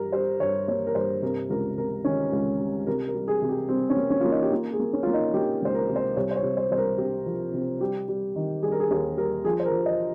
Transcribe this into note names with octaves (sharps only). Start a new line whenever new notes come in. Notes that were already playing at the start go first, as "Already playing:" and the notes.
Already playing: G2 G3 A#4
G3 C5
G2 C#5
A#3 C#5
A#4
G2 C5
C3 A#4
C#2 A#4
C3 A#4
D#3 C#4
C#2
G3
C3 A#4
A#4
G3
G#4
C3
G4
G3 C4
C#4
A#3
C#4
A#3 F4
D#4
G4
A#3 F4
G#4
A#3
C#4
A#3 F4
D#4
A#3 G4
C#2 C5
A#4
C3
C5
C2 C#5
C5
C#5
C2
C5
C2 C5
A#4
C3 G4
F3
C3
G3 G4
G3
D#3
G3 G#4
A#4
G#4
D#2 A#4
G3 A#4
F3 G#4
C5
A#4
F3
D#5